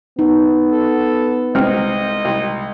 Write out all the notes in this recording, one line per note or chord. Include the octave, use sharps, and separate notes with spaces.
B3 D#4
A4
C2 G#3 C4 D#5 F6
C2